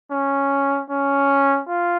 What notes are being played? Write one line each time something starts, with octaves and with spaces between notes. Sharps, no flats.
C#4
C#4
F4